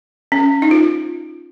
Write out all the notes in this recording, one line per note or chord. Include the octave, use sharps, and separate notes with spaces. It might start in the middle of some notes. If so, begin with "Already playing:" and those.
C#4
D#4
F4